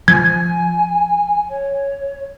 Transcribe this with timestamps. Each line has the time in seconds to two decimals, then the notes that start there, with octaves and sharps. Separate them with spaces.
0.08 F3 G#5 G#6
1.49 C#5